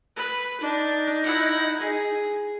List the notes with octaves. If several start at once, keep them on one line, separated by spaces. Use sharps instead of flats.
B4
D4 D#4
E4 F#5
G#4